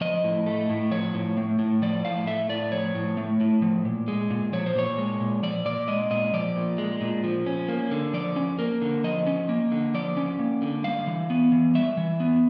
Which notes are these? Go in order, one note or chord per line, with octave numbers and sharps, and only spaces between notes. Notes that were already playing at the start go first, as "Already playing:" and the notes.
F3 D#5
A2
A3
A2
F3 C#5
A2
A3
A2
F3 D5
A2 F5
A3 E5
A2 D5
F3 C#5
A2
A3
A2
F3
A#2
G#3
A#2
F3 C#5
C5
A#2 C#5
G#3
A#2
F3 D5
A#2 D5
G#3 D#5
A#2 D#5
F3 D5
A#2
G#3
A#2
F3
C#4
A#3
D3
F3 D5
C#4
A#3 A#4
D3
F3 D#5
C#4
A#3
D3
F3 D5
C#4
A#3
D3
G3 F5
E3
B3
E3
G3 E5
E3
B3